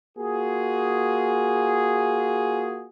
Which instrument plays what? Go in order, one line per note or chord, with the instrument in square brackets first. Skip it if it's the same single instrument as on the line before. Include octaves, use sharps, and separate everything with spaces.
[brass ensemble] A#3 F4 F#4 G#4